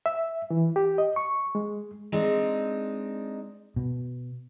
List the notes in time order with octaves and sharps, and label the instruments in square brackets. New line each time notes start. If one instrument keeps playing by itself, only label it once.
[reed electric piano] E5
E3
G4
D#5
C#6
G#3
[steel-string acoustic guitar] G#3 C4 D4 D#4
[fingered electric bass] B2